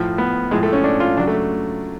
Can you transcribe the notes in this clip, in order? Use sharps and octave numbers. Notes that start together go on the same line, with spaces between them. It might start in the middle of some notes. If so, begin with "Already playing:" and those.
Already playing: A2 F3
B3
A2 F3 G#3
A3
C#4
D4
F4
C#3 F#3 D4
A3